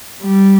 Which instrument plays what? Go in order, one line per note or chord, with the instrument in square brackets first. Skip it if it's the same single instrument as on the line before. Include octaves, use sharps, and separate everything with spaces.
[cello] G3